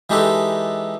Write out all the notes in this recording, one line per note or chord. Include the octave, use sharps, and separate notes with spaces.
E3 G#3 D#4 G4 A4 B4